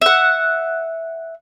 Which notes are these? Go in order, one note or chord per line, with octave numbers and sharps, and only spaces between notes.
E5 F#5